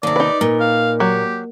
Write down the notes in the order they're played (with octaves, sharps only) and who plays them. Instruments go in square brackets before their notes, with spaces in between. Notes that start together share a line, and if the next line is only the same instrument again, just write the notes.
[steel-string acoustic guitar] D#2 C3 [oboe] D5
[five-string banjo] D#4 B4
[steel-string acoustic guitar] A#2
[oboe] F5
[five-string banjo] F#3 [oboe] G4